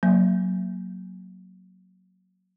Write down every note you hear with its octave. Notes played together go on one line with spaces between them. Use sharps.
F#3 A#3